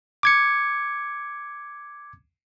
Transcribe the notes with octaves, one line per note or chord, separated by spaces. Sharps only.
D6 G#6 C#7